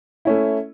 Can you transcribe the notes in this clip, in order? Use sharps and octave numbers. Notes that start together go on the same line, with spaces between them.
A3 C#4 E4